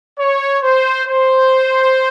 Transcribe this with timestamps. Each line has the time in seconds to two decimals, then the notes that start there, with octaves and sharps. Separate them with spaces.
0.18 C#5
0.62 C5
1.06 C5